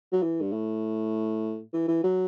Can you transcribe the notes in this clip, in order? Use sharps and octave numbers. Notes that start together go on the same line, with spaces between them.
F#3
E3
G2
A2
E3
E3
F#3